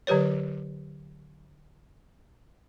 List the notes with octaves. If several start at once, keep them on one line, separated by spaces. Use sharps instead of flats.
D3 F#3 G4 B4 C#5